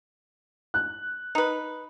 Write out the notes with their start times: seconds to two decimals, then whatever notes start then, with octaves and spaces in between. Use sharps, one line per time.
0.74 F#6
1.35 D#4 B4